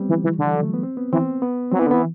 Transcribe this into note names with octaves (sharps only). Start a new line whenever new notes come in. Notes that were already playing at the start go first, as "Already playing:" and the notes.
Already playing: G3 B3 C4
E3
E3
D3
E3
F#3
A3
B3
C4
B3
E3 C4
B3
F#3 C4
E3 B3
D3
B3
E3